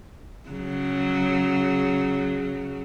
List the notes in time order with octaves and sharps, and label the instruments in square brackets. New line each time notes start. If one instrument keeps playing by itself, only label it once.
[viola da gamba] C#3 F#3